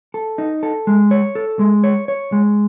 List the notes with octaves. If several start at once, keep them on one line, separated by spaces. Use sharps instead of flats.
A4
D#4
A4
G#3
C#5
A4
G#3
C#5
C#5
G#3